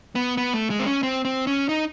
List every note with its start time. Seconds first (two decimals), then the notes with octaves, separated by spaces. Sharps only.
0.15 B3
0.37 B3
0.54 A3
0.70 G#3
0.79 C4
0.86 C#4
1.03 C4
1.25 C4
1.47 C#4
1.69 D#4